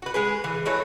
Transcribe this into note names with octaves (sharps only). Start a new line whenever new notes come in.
F#4 B4
G#3 G#4 B4
E3
E3 F#3 A3 C#5